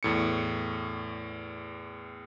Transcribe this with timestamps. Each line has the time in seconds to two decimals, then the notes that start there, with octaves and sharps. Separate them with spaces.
0.03 E2 A2 C#7